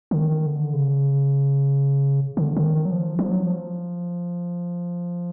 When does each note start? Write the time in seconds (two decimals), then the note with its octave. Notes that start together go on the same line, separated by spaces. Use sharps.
0.11 D3
0.19 D#3
0.46 D3
0.73 C#3
2.37 D3
2.57 D3
2.64 D#3
2.85 F#3
2.91 F3
3.19 F3
3.31 F#3
3.45 F3